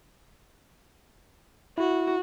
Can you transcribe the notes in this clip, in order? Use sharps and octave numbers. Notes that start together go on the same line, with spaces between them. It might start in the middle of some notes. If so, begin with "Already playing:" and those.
E4 F#4